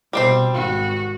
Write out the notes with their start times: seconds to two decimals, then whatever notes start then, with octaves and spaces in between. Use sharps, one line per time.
0.13 B2 G3 C4 C5
0.54 G#1 F#4